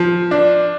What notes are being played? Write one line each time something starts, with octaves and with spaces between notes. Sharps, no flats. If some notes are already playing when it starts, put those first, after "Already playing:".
Already playing: F3
D4